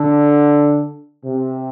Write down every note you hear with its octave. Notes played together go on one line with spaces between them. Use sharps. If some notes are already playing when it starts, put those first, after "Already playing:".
Already playing: D3
C3